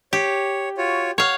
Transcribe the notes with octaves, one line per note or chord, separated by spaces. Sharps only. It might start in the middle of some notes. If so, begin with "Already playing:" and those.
G4 C#5
F4 F#4 C#5
C#5 F5 F#5